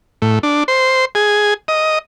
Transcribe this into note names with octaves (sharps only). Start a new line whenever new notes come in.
A2
D4
C5
G#4
D#5